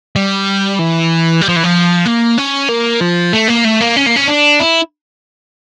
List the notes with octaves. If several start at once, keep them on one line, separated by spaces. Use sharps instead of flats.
G3
E3
G3
F3
E3
F3
A#3
C#4
A#3
F3
A3
A#3
A3
A#3
C#4
A#3
C#4
D4
E4